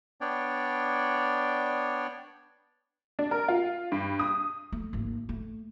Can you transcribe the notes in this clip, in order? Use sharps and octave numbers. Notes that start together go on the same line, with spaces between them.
B3 D4 C#5 D5 G5
D4
A#4
F4
G2
D#6
A3
G#1 A#3
A3